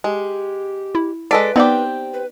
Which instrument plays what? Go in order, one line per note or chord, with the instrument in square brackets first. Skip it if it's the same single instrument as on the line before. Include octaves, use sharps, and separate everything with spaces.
[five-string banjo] G#3 [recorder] G4
[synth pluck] E4
[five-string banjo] G#3 A4 D5 [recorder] B4 [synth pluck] B6 D7
[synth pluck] B3 D#4 D5 [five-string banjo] C4 G4
[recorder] B4